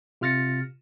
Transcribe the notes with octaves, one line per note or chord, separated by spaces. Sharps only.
C3 F4 F6 A6 A#6 C#7